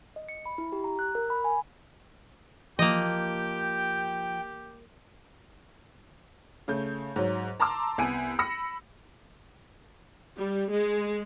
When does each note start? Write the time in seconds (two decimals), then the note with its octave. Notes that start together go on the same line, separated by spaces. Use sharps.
0.16 D#5
0.29 C#7
0.46 B5
0.58 E4
0.72 G4
0.84 A#5
0.99 F#6
1.15 A#4
1.30 B5
1.44 G#5
2.79 F3 A#3 G4 D#5 G5
6.68 C#3 A3 G6
7.16 G#2 F#3
7.60 A5 A#5 C6 D6 E6
7.98 C2 B3 G#5 D7 D#7
8.39 B5 E6 A#6 C#7
10.38 G3
10.72 G#3